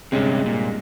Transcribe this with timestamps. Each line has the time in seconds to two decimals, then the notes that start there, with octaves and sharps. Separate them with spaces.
0.12 G2 C3 G#3 C#4
0.46 A#2